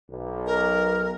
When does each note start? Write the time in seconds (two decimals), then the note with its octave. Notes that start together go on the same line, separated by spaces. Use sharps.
0.11 B1
0.47 A#4